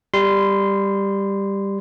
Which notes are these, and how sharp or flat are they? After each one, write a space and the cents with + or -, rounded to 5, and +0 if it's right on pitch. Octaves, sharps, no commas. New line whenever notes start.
G3 +10 C6 -15